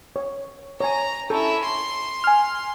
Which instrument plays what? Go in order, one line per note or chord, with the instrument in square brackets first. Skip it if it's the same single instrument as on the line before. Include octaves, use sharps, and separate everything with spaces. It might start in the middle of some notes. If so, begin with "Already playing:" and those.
[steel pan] C#5
[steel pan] C#5 G#5 [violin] A#5
[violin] C#4 E4 [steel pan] A4
[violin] C6
[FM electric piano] G#5 F6